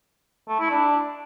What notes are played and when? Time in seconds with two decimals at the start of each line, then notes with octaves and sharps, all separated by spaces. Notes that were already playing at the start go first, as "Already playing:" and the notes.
0.48 A3
0.60 E4
0.71 D4